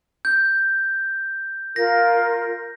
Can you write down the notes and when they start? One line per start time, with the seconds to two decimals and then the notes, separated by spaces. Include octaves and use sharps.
0.25 G6
1.76 F4 A#4 A#6